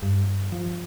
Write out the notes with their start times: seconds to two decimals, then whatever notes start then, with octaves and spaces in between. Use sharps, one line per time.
0.03 G2
0.52 F3